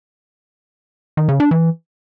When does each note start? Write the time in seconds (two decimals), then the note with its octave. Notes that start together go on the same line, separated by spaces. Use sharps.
1.17 D#3
1.29 C#3
1.40 D4
1.51 E3